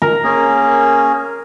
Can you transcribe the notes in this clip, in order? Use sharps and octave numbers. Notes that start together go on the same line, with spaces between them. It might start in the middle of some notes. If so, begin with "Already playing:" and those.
A#4
A#3 C#4 G#4